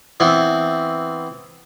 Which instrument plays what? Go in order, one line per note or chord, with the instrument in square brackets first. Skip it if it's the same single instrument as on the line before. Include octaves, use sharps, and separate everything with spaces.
[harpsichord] E3 B3 C4